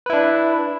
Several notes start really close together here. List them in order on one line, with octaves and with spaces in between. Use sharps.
B4 E4 D4